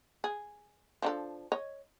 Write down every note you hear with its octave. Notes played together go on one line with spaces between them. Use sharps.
G#4
F3 D4 A4
C#5 D#5